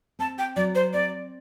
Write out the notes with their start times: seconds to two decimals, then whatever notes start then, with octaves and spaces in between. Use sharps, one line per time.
0.19 C4 A5
0.39 G5
0.56 F#3 D5
0.75 C5
0.93 C4 D5